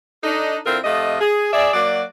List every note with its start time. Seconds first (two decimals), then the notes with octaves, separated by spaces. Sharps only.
0.24 D4 D#4 A4
0.66 D3 C4 E4 F4 A4 A#4
0.84 F2 A3 F4 G4 D#5
1.21 G#4
1.53 G#4 D5 E5
1.74 F#3 A#3 F#4 D5